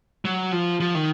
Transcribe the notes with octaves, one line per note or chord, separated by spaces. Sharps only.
F#3
F3
F3
D#3